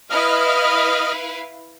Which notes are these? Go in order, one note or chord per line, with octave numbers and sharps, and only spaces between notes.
E4 B4 D#5 F5 F6